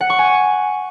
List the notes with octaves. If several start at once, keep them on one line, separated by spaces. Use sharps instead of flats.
F#5
C#6
G#5